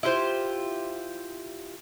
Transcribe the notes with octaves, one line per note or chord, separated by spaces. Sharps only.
E4 F4 G4 C5